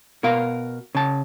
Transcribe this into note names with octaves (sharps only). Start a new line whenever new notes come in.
B2 A#4 F5
C#3 A5